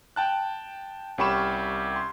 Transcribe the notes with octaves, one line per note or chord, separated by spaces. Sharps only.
G5 A5 F#6
C2 C#4 G4 B5 C#6 E7
C6